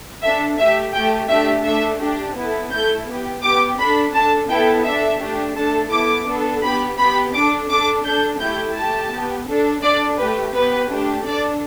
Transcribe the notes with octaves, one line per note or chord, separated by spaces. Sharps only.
D4 A4 E5
A3 G4 E5
A3 G4 G5
A3 D4 G4 E5
A3 D4 A4 E5
D4 G4
B3 E4 A4
A3 E4 A4 G6
B3 G4
B3 G4 D6
D4 A4 B5
D4 A4 A5
B3 E4 A4 G5
D4 A4 E5
A3 D4 G4
A3 D4 A4 A5
B3 E4 A4 D6
B3 D4 A4
B3 G4 B5
B3 G4 B5
D4 A4 D6
D4 A4 D6
D4 A4 G6
A3 E4 G4 G6
A3 G4 A5
B3 G4
D4 A4
D4 A4 D5
A3 G4 B4
B3 G4 B4
A3 D4 G4
D4 A4 D5